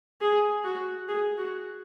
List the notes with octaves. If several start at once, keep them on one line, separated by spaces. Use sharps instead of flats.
G#4
F#4
G#4
F#4